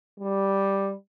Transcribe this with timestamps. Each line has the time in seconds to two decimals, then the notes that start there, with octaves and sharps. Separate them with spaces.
0.20 G3